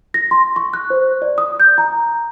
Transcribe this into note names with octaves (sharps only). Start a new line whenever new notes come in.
A#6
C6
C#6
F#6
C5
D5
D#6
G6
A#5